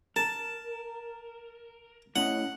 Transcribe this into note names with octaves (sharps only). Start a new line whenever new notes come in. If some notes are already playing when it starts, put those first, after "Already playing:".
A#4 A5
A2 C#4 D#5 F#5